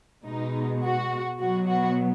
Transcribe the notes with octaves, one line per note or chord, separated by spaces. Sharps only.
B2 G#3 B3 D#4
F#4
B2 F#3 B3 F#4
F#4